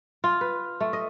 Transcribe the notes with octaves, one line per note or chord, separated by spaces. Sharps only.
F4
B4
A3
D#5